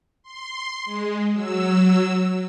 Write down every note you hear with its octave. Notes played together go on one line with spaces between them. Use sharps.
C6
G#3
F#3 E6